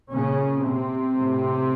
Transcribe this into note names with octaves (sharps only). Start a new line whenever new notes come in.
A#2 C#3 C#4
C3 C4
A2